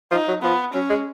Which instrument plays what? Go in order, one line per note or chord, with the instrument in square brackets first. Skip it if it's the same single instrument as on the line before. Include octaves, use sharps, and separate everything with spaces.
[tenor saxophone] F3 [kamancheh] D#4
[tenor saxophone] F#3
[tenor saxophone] F3 [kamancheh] B3
[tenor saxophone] F#3 [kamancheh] C#4
[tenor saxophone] G#3